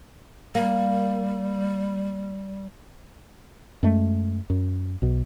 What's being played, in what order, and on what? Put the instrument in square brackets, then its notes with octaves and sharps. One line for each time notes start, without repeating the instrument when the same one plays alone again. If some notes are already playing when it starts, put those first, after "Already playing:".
[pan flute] G3 [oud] A#3
[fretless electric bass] F#2 G#3 A3
F#2
B1 B2